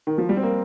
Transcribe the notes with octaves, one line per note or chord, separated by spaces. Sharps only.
D#3
F3
G3
C4
A#3